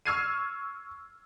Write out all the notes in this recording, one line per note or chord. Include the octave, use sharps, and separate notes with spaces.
C#6 E6 F6 G#6 C7 D#7